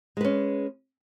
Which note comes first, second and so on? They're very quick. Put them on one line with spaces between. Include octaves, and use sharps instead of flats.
G#3 B4 C#4